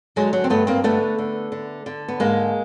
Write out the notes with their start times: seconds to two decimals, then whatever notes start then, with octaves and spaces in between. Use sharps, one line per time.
0.16 D3 F#3 G#3
0.33 F#3
0.44 C4
0.50 G2 A3 B3
0.67 A#3 C4
0.84 D3 A3 B3
1.18 D3
1.52 D3
1.86 D3
2.08 B3
2.20 G#2 G#3 A#3